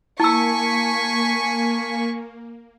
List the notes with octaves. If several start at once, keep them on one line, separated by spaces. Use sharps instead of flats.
A#3 E4 G#5 A5 C#6 E6 B6